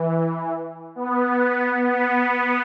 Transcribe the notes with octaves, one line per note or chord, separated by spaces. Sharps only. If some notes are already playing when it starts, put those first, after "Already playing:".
Already playing: E3
B3
B3